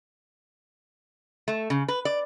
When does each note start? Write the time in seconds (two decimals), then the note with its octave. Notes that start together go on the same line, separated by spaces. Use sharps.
1.48 A3
1.70 C#3
1.88 B4
2.05 D5